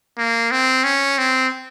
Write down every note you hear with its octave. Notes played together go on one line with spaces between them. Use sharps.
A#3
C4
C#4
C4